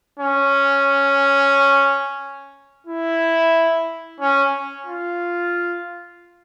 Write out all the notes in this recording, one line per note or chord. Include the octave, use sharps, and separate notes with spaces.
C#4
E4
C#4
F4